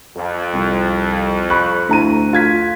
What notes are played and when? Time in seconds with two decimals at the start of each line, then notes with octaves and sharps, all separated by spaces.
0.16 F2
0.54 C2
1.50 B5 C#6 F#6
1.89 D2 E4 A#5 D#7
2.33 F4 G#6 B6